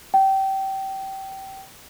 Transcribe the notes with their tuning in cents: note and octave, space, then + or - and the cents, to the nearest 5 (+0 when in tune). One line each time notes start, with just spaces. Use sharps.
G5 -25